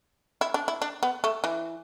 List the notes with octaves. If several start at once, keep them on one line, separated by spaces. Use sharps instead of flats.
E4
D4
E4
D4
B3
A3
E3